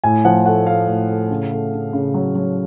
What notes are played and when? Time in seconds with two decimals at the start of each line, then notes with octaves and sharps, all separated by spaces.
0.04 A2 G#5
0.25 F3 F#5
0.46 A3 F#5
0.66 A3 F5
0.87 A2
1.09 A3
1.30 C#3
1.52 A3
1.73 C#3
1.93 C#3
2.14 F#3
2.35 F#3